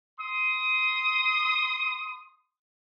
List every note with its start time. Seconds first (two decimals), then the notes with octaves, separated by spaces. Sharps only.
0.19 C6 D#6